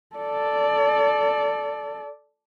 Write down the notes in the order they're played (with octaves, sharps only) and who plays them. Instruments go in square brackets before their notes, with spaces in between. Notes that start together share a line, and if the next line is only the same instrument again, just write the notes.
[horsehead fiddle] A4 D5